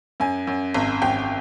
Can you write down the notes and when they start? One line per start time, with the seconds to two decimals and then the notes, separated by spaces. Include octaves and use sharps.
0.20 F#2 G#5
0.47 F#2
0.74 G#1
1.02 G#1 G5